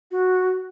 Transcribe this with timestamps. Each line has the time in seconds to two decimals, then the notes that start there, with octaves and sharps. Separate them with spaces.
0.11 F#4